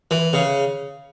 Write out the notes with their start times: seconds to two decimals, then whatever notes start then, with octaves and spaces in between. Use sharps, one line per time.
0.11 E3
0.33 C#3